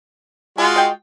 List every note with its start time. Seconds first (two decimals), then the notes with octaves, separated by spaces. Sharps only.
0.58 G#3 F4 F#4 G#5
0.76 D#5 G5